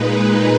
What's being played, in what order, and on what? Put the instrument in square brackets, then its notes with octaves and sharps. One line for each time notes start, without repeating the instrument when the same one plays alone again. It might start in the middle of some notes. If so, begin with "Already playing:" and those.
Already playing: [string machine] A#2 G#3 D#4 B4